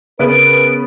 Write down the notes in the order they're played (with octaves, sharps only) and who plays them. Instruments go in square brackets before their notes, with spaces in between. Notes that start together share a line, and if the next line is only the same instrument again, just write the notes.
[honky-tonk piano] C#3 B3 B4 [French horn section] A#4 [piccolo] D7